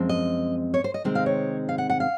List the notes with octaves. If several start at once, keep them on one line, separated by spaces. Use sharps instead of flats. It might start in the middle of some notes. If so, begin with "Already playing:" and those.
Already playing: F#2 F3 G#3 C4
D#5
C#5
C5
D#5
C3 D#3 G#3 C4
F5
C#5
F5
F#5
F#5
F5